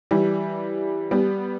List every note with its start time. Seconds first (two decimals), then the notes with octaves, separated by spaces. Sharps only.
0.11 E3 G3
1.11 G3 B3